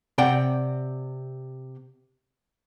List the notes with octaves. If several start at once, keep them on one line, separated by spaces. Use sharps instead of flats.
C3 D5 F#5 G5